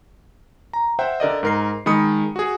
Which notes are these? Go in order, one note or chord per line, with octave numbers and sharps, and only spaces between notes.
A#5
C5 E5 F#5 G5
D3 A#4 D5 D#5
G#2 A#4 C7
D#3 G#3 B5 D#6 C#7
F#4 G#4